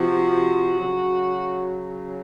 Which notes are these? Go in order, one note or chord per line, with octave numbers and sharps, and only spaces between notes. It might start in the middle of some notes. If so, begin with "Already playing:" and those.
Already playing: C3 F3 F#4
C#3 F#3